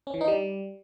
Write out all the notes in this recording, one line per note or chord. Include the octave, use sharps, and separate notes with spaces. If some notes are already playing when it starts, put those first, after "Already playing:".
C#4
E3
D#4
G3